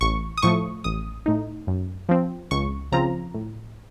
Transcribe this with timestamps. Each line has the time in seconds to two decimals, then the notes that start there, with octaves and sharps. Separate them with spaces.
0.01 A1 C#6
0.37 D#6
0.42 A2 F3 A3 C#6
0.84 A1 D#6
1.26 A2 A3 D#4
1.67 F#2
2.09 F3 C4
2.51 C#2 C#6
2.92 C#3 F3 C4 F4 A#5
3.35 A2